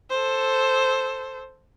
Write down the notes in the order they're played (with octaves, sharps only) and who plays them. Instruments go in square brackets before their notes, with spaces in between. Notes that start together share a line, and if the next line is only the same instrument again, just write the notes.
[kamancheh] A4 C5